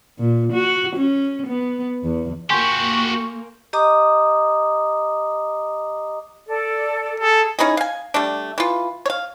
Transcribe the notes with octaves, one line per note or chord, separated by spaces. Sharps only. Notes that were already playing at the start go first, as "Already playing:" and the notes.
A#2
F#4
C#4
B3
E2
A#3 F#4 G4 G#5 C6 C#6 G6
G4 D#5 A#5 D6 D#6
A4 D5
G#4 A4 A5
C#4 D#4 E4 G#4
F5 G#5
G3 A3 D4
E3 F4
C#5 F5